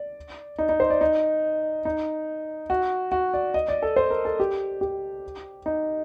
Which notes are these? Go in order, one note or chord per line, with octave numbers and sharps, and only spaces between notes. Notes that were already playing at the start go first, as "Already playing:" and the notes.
Already playing: D5
D#4
D#4
C5
D5
D#4
D#4
F#4
F#4
D5
D#5
D5
A4
C5
A#4
A4
G4
G4
D#4